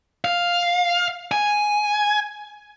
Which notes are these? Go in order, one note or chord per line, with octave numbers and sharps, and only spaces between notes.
F5
G#5